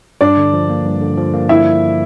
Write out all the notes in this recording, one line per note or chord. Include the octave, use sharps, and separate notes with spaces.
G2 D4 D5
D3
F3
A#3
G2
D3
F3
A#3
E4 E5